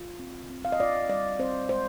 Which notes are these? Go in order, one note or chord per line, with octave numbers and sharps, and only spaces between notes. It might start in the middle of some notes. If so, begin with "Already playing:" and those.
Already playing: F4
C4
C4
F5
D#5
F4 D5
G3 D5
C4 C5
G#3 C5